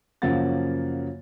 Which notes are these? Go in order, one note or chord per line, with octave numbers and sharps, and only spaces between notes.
F#2 C#3 F3 A#3 F#5 A6